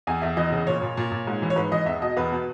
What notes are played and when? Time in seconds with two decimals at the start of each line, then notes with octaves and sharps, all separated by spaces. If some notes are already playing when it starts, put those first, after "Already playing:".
0.07 E2 G#5
0.22 E2 E5
0.37 E3 D#5
0.52 C#3
0.67 A#2 C#5
0.82 A#2
0.97 A#2
1.12 A#2
1.27 G#2
1.42 E3
1.50 C#5
1.56 G#2 B4
1.72 E3 D#5
1.86 E2 E5
2.01 B2 D#5
2.16 E2 B4
2.32 B2